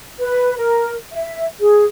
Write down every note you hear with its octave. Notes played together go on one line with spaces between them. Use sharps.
B4
A#4
E5
G#4